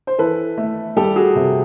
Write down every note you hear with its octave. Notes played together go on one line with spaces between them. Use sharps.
C5
E3 A4 B4
A3
G3 G4 A4
F#4 G#4
C3